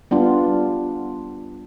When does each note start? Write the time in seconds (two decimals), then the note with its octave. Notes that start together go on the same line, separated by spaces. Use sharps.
0.11 G3 B3 D4 F4